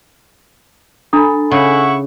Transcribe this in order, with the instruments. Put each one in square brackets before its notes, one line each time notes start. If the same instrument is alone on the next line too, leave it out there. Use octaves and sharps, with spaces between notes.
[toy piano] D4 A#5 D#6 [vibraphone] A4 G#5 B5
[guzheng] C#3 [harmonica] E4 F#5 C#6